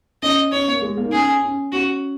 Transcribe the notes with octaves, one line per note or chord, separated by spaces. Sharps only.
C#4 D#5
C#4 C#5
A#3
G#3
A#3
D#4
C#4 G#4
C#4
C#4 F#4